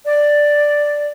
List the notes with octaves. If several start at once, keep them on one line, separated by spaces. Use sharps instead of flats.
D5